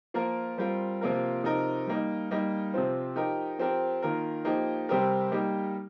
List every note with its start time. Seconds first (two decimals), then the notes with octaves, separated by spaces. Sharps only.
0.14 F3 A#3 F4 A#4
0.58 G3 C4 F4 A#4
1.01 C3 F3 A#3 F4 A#4
1.44 C3 F3 D#4 A#4
1.86 G3 A#3 D#4
2.31 G3 A#3 D#4
2.74 C3 F3 C4
3.16 F3 D#4 G4 A#4
3.59 F3 C4 G4 A#4
4.02 D#3 A#3 F4 A#4
4.45 F3 A#3 D#4 G4
4.89 C3 G3 C4 G4 A#4
5.32 G3 A#3 D#4 G4